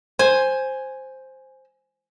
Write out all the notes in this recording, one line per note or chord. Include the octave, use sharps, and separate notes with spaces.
C5 G#5